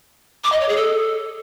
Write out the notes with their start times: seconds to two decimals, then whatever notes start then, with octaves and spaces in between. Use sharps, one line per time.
0.44 D6
0.52 D#5
0.60 C#5
0.68 G#4
0.76 A4